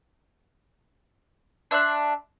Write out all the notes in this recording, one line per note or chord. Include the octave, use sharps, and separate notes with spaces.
D4 E5 C6 F#6